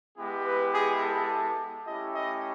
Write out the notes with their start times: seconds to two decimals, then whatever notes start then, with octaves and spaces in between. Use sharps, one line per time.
0.17 G#3 B3 E4 G4
0.45 B4
0.73 G#4
1.02 A4
1.87 A3 C#4 E4 G4 D#5
2.15 D#5